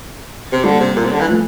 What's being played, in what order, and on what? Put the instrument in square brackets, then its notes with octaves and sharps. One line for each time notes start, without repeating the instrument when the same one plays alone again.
[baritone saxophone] C3
[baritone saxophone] D3 [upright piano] G3 A#3
[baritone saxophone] C3
A#2
C3
D3
E3
[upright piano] F3 A3